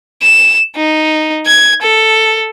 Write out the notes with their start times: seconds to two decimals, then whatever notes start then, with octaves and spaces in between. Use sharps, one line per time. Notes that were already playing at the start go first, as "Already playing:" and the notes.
0.22 E7
0.76 D#4
1.46 G#6
1.82 A4